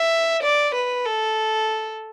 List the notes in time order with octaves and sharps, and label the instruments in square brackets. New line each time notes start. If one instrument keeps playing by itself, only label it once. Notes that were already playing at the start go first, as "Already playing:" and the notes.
Already playing: [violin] E5
D5
B4
A4